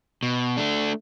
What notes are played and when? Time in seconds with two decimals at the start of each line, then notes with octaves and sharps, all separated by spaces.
0.23 B2
0.57 A3 D4